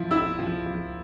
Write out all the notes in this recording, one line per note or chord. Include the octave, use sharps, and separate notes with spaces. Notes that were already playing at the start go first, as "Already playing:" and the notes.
Already playing: F3 E4
E4 E6
F3
F3